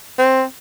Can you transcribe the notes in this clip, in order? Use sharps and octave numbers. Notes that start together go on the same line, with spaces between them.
C4